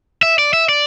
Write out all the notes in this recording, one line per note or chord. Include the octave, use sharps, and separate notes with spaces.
E5
D5
E5
D5